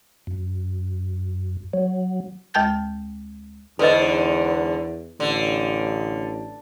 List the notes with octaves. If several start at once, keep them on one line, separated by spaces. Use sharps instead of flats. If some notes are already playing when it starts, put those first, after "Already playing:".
F#2
F#3
D2 G#3 G5 A5 G6 A6
E2 G#2 D3 A4 B4 D#5
A1 D3